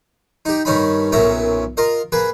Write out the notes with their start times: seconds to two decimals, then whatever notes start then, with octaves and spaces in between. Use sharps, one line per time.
0.45 D#4 G4
0.65 G2 D#3 C#4 D#4 B5
1.12 B1 F#2 A#2 C#4 E5 A#5
1.77 F4 A#4 D#5
2.12 A#3 G#4 B4